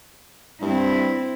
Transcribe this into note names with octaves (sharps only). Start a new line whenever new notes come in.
G2 C4 E4